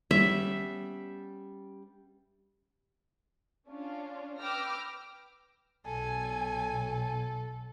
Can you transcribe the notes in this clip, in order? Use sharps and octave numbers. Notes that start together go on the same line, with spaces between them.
G3 B3 C#4 E5
C#4 D4 F4
B4 G5 D6 E6 F6 A#6
B1 B2 A4 G#5